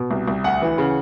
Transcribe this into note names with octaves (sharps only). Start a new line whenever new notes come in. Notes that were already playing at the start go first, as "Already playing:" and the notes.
Already playing: B2
C2
C2
D2 F#5
E3
C#3